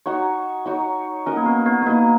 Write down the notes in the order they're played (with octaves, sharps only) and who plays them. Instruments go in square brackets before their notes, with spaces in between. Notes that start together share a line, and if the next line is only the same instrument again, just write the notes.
[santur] D#4 F#4 C#5
D#4 F#4 C#5
[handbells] C#4 [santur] D#4 F#4 A#4 D#5
[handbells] A#3
B3
B3
B3
[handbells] A#3 [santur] D#4 F#4 A#4 D#5